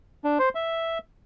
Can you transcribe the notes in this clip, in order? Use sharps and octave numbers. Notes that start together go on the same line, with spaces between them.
D4
C5
E5